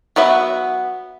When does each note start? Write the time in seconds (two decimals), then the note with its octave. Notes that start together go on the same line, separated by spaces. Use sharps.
0.16 F#3 B3 B4 E5